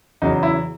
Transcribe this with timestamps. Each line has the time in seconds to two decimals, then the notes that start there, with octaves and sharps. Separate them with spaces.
0.22 E2 C#3 F#3 D#4
0.43 E4